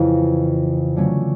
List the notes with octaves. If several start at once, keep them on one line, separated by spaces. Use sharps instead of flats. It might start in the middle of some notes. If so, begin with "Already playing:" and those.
Already playing: F2 C#3 E3
D3 F#3 A3 C#4